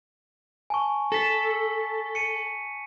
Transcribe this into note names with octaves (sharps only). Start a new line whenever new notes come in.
G#5 A5 C#6
A4 A#6 B6
C#7 D#7